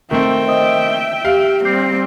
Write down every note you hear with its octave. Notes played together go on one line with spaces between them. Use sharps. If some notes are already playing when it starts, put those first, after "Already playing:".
D#3 A3 C4 E5 G5
C5 D#5 D#6
D7 G7
G4 F5
G3 C4 D6 G6 C7